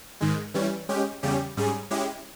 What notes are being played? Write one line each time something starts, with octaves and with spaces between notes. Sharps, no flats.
G#2 D#3 G#3
E3 G3 C#4
G#3 C#4 G4
E2 C#3 G3 C#4 G4
G#2 G3 C#4 G#4
G#3 C#4 E4 G4